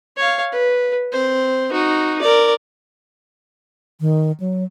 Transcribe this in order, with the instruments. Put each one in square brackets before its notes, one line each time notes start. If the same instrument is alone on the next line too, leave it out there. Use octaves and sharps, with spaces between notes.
[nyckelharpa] C#5 F5
B4
C4 C5
D#4 F#4
A#4 D5
[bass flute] D#3
F#3